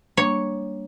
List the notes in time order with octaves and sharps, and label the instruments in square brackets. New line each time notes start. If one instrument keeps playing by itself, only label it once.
[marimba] G3 A#3 D4 [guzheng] C#5